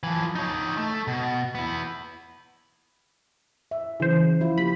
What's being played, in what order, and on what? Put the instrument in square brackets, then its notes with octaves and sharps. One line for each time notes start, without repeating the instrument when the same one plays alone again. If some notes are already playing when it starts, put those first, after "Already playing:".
[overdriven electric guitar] E3 F3
D#4 C#5
A3
B2
B3 E4
[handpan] E5
[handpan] C#3 F#3 [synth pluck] E3 C5
[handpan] F3 E4 F4
[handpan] A#3 G4 [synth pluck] B5